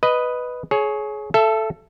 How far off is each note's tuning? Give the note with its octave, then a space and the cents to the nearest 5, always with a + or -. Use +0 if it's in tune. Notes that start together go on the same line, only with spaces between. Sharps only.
B4 +0 D#5 +0
G#4 +25 C#5 +0
A4 -5 E5 +25